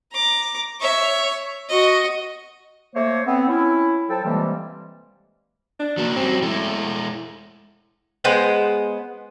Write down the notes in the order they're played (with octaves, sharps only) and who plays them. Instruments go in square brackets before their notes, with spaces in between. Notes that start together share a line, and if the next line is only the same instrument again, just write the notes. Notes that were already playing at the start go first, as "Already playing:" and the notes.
[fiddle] A#5 D6
C#5 E5
F#4 D#5
[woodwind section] A3 A#3 C5 C#5
B3 C4
C#4 E4
F3 F#3 A4 G5 A5
C3 E3 G3 G#3 A#3
[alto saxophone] D4
[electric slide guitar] F#3 A#3
[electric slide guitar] F#3 G3 C#4 [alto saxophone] C4
[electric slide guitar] G#3 E4 [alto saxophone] A3
[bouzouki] G#3 B3 C5